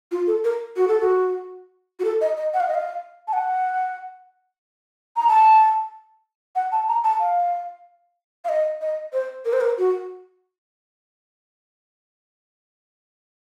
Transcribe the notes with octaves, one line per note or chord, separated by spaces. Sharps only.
F4
A4
A#4
F#4
A4
F#4
F#4
A4
D#5
D#5
F#5
F5
D#5
F5
A5
F#5
A#5
A5
F#5
A5
A#5
A5
F5
F5
D#5
D#5
C5
A#4
C5
A#4
F#4